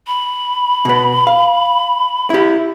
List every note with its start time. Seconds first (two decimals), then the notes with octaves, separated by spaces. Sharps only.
0.07 B5
0.85 B2 B3
1.27 F5
2.30 E4 G4